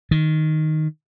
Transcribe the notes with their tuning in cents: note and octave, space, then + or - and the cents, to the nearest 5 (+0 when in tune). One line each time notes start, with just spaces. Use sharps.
D#3 +0